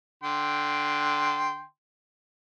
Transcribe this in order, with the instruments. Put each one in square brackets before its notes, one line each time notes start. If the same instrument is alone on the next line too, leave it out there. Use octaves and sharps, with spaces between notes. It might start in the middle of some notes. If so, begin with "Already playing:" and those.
[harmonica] D3 G5 C6